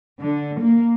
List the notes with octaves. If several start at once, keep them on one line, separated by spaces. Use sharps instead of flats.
D3
A#3